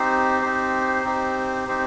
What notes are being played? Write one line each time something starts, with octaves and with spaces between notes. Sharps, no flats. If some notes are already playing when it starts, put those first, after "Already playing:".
Already playing: C4 D#4 G4 C5
C4 D#4 G4 C5
C4 D#4 G4 C5
C4 D#4 G4 C5